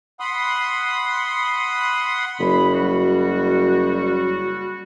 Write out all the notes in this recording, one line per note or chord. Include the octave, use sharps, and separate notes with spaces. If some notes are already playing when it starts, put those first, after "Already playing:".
F#5 B5 C6 D#6
F#1 B5
G3 F#4